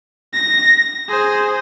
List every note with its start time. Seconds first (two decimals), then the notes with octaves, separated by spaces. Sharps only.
0.34 A#6
1.09 G#4 C5